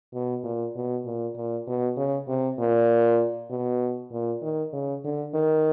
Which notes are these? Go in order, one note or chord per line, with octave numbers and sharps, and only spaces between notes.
B2
A#2
B2
A#2
A#2
B2
C#3
C3
A#2
B2
A#2
D#3
C#3
D3
D#3